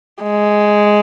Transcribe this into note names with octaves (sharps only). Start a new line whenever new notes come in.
G#3